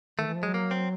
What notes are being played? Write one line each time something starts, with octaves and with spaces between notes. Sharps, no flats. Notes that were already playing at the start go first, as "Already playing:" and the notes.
D#3 A3
E3
F3
F#3 G#3
A#3
C4